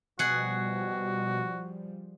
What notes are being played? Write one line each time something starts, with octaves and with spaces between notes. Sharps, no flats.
B2 F3 G3 F#4 G#4 F#5